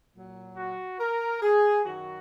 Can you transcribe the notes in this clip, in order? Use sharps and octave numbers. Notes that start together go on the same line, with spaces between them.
A#2 F#3
F#4
A#4
G#4
F#2 D#3 F#3 F#4